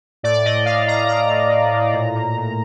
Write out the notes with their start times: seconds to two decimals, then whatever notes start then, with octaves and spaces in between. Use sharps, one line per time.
0.23 A2 D5
0.45 A2 D#5
0.66 A2 F5
0.88 A2 A#5
1.08 A2 A#5
1.29 A2
1.51 A2
1.72 A2
1.93 A#2
2.15 A#2
2.37 A#2